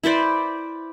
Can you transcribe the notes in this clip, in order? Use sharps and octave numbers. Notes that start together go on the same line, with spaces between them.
E4 B4 C5 D5